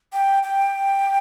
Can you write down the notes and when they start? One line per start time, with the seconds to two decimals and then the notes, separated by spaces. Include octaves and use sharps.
0.13 G5
0.43 G5